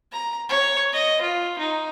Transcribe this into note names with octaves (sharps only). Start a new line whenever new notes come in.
A#5
C#5
D#5
F4
D#4